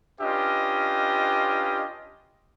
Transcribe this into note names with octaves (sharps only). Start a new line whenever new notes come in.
C#4 D4 F4 G4 B4 D#5